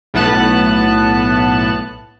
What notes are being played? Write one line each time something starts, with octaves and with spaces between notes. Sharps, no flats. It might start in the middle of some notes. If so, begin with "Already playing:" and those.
B1 A2 B3 A5 F#6